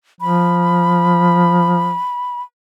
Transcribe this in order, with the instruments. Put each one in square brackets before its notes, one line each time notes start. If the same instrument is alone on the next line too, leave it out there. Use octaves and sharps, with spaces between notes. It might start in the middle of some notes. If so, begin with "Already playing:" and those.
[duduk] F3 [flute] B5